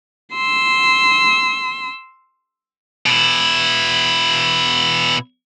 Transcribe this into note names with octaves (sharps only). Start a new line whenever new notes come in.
C6 E6
B2 E4